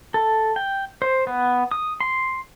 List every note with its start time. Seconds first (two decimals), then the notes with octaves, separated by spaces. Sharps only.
0.14 A4
0.56 G5
1.02 C5
1.27 B3
1.71 D#6
2.01 C6